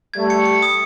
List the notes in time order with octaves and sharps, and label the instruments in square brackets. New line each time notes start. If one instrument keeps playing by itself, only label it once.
[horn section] G3 A3 [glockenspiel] G#6
[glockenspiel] C#7
C#7
D#6